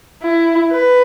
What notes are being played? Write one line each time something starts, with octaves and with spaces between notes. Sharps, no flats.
E4
B4